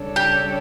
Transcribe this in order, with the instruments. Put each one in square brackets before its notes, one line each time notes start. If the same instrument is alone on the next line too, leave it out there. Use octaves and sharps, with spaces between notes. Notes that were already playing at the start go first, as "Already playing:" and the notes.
Already playing: [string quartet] C#3 G3 D4 A4 C#5
[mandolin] G4